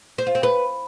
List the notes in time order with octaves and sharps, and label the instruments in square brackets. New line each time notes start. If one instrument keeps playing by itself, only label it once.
[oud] C5
F4
C4
B4